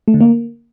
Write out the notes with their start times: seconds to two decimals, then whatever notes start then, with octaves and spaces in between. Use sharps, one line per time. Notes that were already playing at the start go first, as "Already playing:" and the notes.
0.08 A3
0.14 D3
0.21 A#3